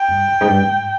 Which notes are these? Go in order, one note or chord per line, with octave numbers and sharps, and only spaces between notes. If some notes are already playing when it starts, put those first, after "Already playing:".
Already playing: G5
G2
F2
G#2
G2
G#2